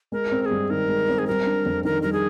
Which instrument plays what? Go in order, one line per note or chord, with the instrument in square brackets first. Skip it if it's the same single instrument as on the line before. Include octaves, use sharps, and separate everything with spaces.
[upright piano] G#3 [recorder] A#4
[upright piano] C4
[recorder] A#4
G#4
[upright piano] G2
[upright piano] D#3 [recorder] A#4
[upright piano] G#3
C4
[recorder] G#4
[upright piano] G3 [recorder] A#4
[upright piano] D4
F2
[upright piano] D#3 [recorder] A#4
[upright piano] G3 [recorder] A#4
[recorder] G#4